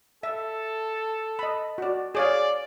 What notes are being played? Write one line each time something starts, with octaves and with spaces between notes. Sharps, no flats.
A4 E5
D#5 B5
F#4 D5
G#4 C#5 D5 F5